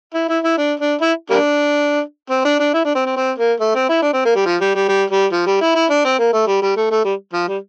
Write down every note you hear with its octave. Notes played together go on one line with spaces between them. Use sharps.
E4
E4
E4
D4
D4
E4
G3 A#3 D4
C4
D4
D4
E4
D4
C4
C4
C4
A#3
A3
C4
E4
D4
C4
A#3
G3
F3
G3
G3
G3
G3
F3
G3
E4
E4
D4
C4
A#3
A3
G3
G3
A3
A3
G3
F3
G3